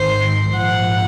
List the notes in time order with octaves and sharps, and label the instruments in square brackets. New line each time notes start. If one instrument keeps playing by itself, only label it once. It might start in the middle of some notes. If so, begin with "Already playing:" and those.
Already playing: [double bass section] G#1 G#2 D#3 [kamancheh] C5
[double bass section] A#1 G#2 F3 A#3 [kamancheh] F#5